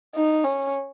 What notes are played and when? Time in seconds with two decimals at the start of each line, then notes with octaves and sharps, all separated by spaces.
0.15 D#4
0.44 C#4